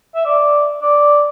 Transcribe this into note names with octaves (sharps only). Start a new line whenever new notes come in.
E5
D5
D5